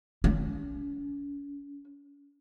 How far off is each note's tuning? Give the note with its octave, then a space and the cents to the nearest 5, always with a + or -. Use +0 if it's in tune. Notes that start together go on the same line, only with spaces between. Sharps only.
C#4 +40